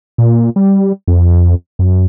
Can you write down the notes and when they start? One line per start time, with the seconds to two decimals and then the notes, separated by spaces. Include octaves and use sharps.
0.18 A#2
0.56 G3
1.08 F2
1.79 F#2